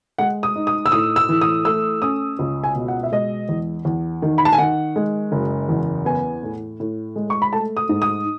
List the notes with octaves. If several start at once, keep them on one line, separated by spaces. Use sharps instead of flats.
G#3 F#5
D#6
D#4
D#6
E6
A2 D#6
E6
E3
D#6
A3 E6
C#4 D#6
C#2
G#5
B2
F#5
E5
G#3 D#5
E2
E2
D#3
B5
A5
G#5
D#3 F#5
G#3
F#1
E2
B3 G#5
A2
A2
G#3
C#6
B5
A3 A5
D#6
G#2
D#6